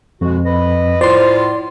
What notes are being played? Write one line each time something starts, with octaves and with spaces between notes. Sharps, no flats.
F2 B2 G#3 F#4
B4 D#5
A2 F4 C5 D5 C6